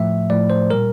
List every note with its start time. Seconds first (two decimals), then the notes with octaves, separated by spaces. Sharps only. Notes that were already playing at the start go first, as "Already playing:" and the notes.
Already playing: A2 F3 A3 E5
0.30 A2 F3 A3 D5
0.50 C5
0.70 A#2 G3 A#4